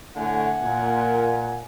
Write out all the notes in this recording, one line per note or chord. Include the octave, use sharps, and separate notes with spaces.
A2 D3 A3 F#5 G#5
A#2